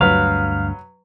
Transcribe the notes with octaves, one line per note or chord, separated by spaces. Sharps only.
D2 G2 F#3 B4 F5